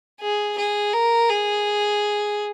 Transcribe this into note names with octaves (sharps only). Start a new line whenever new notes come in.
G#4
G#4
A#4
G#4